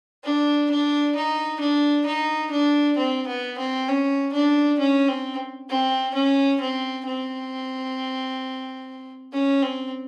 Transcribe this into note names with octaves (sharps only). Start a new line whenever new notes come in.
D4
D4
D#4
D4
D#4
D4
C4
B3
C4
C#4
D4
C#4
C4
C4
C#4
C4
C4
C#4
C4